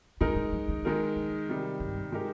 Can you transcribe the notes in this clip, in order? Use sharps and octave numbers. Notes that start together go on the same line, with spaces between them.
D3 G#3 D#4 A#4
D3
F3
D#3
D#3 G#3 D#4 A#4
F3
C3 D#3 G3
G2
G#3 D#4 G4 A#4